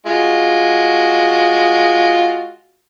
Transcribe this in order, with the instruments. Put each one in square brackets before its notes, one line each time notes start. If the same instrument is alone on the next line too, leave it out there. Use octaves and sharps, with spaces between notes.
[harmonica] G#3 F4 F#4